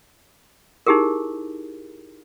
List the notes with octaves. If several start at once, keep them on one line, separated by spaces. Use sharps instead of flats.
D#4 E4 G4 G#4 A#4